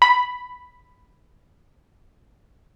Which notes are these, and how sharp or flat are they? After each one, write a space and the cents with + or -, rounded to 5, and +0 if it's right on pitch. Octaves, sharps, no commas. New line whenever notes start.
B5 +0